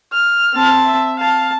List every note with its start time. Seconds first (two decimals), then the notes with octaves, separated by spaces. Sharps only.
0.13 F6
0.54 C4 A5
0.85 E5
1.19 F5 A5